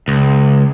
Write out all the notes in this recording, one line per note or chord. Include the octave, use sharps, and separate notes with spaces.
C#2